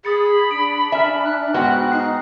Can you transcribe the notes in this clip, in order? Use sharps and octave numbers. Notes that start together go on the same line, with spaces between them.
G#4 B5 D#6 A6 C#7
D4 D7
E5 G#5 A#5 F6
F#6
G#2 B3 F#4 G5
D#4 C7